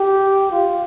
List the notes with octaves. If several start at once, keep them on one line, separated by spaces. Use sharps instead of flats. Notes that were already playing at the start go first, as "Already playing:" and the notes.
Already playing: G4
F4